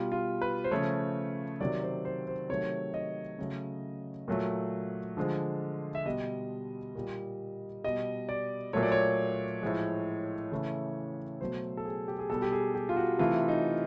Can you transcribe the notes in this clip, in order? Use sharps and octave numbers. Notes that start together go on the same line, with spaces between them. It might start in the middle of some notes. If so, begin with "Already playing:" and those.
Already playing: B2 G3 F4
F4
B4
C5
C#3 F3 A3 C#5
C3 D#3 F#3 D5
C5
C5
C5
C3 D#3 F#3 A3 C#5
D#5
C#3 F#3 A3
A#2 F#3 A3
D3 F3 G#3
E5
B2 G3 D#5
A#2 G3
B2 G3 D#5
D5
A#2 F#3 A3 C#5
D5
C#5
A2 F3 G#3
C#3 E3 A3
B2 F#3 A3 C5
A4
G#4
G4
G#4
B2 G3 A4
G4
G#4
G4
F4
F#4
C3 E3 A3 F4
D#4